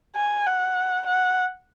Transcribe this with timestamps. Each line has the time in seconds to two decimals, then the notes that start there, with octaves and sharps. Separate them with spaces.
0.16 G#5
0.46 F#5
1.06 F#5